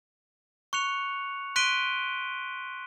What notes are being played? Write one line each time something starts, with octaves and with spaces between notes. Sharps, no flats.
C#6 F#6 C#7 F7
C6 F#6 B6 D7 D#7 G7